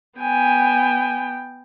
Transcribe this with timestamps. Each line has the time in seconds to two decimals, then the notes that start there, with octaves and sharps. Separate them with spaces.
0.19 B3 G5 G#5